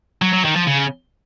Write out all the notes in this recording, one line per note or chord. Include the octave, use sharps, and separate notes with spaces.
F#3
F#3
D#3
F3
C#3